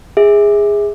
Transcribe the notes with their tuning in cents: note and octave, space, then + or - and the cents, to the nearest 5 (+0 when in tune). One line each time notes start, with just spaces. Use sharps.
G#4 -15 E5 -20